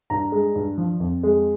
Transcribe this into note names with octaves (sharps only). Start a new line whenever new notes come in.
G2 A#5
G#3
G2
F3
F2
G#3